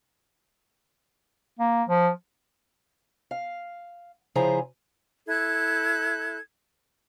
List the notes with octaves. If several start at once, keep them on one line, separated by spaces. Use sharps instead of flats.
A#3
F3
F5
C#3 F3 E4 G#4 C5 A#5
E4 A4 F#6 G#6